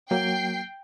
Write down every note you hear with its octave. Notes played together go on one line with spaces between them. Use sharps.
F#3 A#3 G5 C7